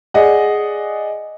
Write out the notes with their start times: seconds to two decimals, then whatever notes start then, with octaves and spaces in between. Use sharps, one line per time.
0.14 G#4 D5 D#5 F#5